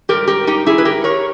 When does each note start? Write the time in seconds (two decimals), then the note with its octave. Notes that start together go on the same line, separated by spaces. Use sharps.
0.09 G#2 G3 G4 A#4
0.27 G4 A#4
0.47 D#4 G4
0.66 E4 G#4
0.78 B4
0.85 G4 A#4
1.04 A#4 C#5